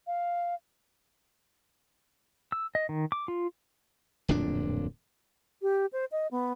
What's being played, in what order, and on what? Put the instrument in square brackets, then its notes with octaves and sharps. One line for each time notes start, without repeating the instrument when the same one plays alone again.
[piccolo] F5
[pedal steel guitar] E6
D#5
D#3
D6
F4
[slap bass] D1 F2 A#2 D4
[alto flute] G4
C5
D#5
B3